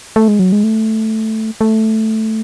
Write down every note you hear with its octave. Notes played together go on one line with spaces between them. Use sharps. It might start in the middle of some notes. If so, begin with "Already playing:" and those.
A3
G#3
F#3
G#3
A3
A3